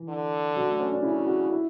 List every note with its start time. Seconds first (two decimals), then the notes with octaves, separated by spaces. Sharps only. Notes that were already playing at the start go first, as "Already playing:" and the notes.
Already playing: E3
0.09 D3
0.56 F#3
0.68 A3
0.79 C#4
0.92 D4
1.03 C#3 E4
1.16 E4
1.27 F#4
1.39 E4
1.51 E4